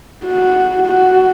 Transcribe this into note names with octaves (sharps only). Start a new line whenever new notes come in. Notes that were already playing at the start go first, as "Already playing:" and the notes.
F#4
F#4